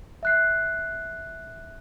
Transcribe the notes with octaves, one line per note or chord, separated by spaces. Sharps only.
E5 F#6 C7